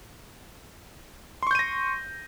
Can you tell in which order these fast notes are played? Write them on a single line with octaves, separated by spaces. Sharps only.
C6 C#6 G6 D#7 A#6